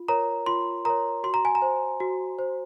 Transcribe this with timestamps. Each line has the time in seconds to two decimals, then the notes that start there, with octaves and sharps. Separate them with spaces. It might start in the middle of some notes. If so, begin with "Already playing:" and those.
Already playing: F4
0.08 A#4 C#5 A#5
0.46 F4 C6
0.85 A#4 C#5 A#5
1.23 F#4 C6
1.34 A#5
1.45 G#5
1.55 A#5
1.62 C5
2.00 F#4
2.39 C5